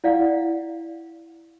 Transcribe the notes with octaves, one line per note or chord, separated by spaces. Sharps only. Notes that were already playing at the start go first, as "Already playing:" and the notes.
E4 D5 F5 F#5